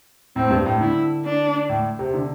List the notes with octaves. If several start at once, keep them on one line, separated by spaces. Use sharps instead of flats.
A2 C4
G2
A2
D3 E4
D4
A2
C3
D3